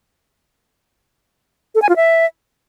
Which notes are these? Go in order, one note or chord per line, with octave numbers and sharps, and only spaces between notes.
A4
G#5
F4
E5